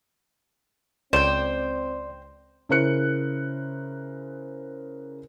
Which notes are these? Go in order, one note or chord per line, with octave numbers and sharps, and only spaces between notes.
C#2 C4 C5 D5 G5
C#3 E4 A#4 C5 F#6 C#7